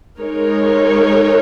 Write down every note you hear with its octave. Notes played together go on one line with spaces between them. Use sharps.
G#3 D#4 A#4 C#5